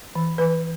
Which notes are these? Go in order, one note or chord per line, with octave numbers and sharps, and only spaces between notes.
E3
E3 B4